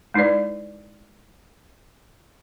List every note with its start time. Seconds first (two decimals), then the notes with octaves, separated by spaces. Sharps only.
0.14 G#3 D#4 E4 B4 D5